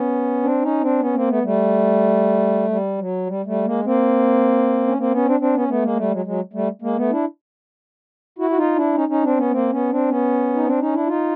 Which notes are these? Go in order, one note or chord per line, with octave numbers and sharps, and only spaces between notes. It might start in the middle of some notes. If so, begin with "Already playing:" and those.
Already playing: B3 C#4
C4 D4
C#4 D#4
C4 D4
B3 C#4
A#3 C4
A3 B3
G3 A3
G3
F#3
G3
G3 A3
G#3 A#3
A#3 C4
C#4
A#3 C4
B3 C#4
C4 D4
C4 D4
B3 C#4
A3 B3
G#3 A#3
G3 A3
F#3 G#3
F#3 G#3
G3 A3
G#3 A#3
A3 B3
D4 E4
E4 F#4
F#4
D#4 F4
D4 E4
C#4 D#4
C#4 D#4
C4 D4
B3 C#4
A#3 C4
B3 C#4
C4 D4
B3 C#4
D#4
C4 D4
C#4 D#4
D4 E4
D#4 F4